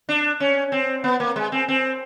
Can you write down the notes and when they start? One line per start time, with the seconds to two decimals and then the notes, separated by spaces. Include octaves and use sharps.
0.09 D4
0.40 C#4
0.72 C4
1.04 B3
1.20 A#3
1.36 G#3
1.52 C4
1.68 C4